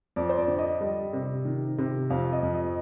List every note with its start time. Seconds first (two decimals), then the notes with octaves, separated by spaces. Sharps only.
0.16 F2 D5
0.29 C5
0.37 D5
0.48 D3
0.59 D#5
0.81 G3
1.13 C3
1.45 D#3
1.78 C3
2.10 F2 F5
2.33 D#5
2.43 F2
2.54 D#5